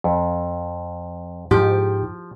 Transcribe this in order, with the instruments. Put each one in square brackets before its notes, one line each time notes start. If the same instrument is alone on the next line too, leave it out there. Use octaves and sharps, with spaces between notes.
[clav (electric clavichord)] F2
[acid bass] G#2 [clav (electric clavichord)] F3 [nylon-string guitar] G4